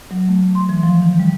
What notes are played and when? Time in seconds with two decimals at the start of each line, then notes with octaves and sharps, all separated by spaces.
0.11 F#3
0.29 A3
0.55 C6
0.69 E3
0.83 F3
1.02 D#3
1.20 G3